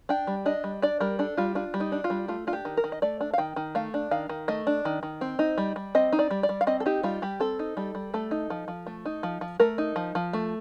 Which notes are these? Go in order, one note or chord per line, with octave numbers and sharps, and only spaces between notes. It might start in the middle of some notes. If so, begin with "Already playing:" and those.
D4 G5
G3
D4 D#5
G3
D4 D5
G3 A#4
D4 A4
G3 F4
D4 F4
G3
D#4
D4
F4
G3
A3 F4
D4 F4
G4
D#3
A#4
D#3
D#5
A3 D5
D4
F5
D#3 G5
D#3
A3 F5
D4
D#3 F5
D#3
A3 D#5
D4
D#3
D#3
C4
D#4
G3
G3
C4 D#5
D#4
D5
G3
D5
G3
F5
C4 D#5
A4
D#4 G4
G3 F4
G3 G4
C4 A4
D#4
G3 A4
G3
A3 A4
D#4
F3
F3
A3
D#4
F3
F3
A3 A#4
D#4
F3
F3
A3